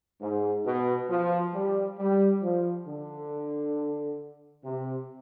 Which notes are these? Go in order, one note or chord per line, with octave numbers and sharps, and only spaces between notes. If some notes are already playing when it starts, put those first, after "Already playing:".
G#2
B2
F3
G3
G3
F3
D3
C3